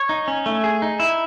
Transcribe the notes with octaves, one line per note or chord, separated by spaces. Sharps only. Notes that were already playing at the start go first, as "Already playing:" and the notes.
Already playing: C#5
D#4
C#4
A3
G#4
D#4
E4